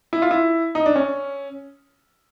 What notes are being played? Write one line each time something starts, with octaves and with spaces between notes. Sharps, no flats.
E4
F4
E4
D#4
D4
C#4